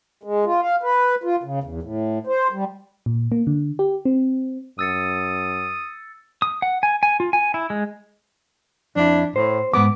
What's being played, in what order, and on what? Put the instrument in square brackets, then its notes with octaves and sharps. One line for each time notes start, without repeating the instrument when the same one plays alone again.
[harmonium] G#3
F4
F5
B4
F4
C#3
E2
A2
C5
G3
[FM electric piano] A#2
A#3
D3
G4
C4
[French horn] F#2 [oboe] D#6 [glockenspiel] E6 A6 C#7
[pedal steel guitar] D#6
F#5
G#5
G#5
F4
G#5
E4
G#3
[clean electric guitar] F2 E4 [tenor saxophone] D4
[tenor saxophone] A2 [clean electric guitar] C5
[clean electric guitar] F2 G#2 [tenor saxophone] B3 [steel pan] D6